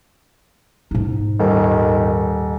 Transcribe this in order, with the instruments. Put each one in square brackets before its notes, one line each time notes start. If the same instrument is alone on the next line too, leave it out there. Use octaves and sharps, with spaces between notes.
[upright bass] G#2 D#4
[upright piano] D#1 [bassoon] D#3